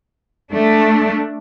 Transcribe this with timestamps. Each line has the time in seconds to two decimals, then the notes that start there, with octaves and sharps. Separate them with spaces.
0.53 A3 D4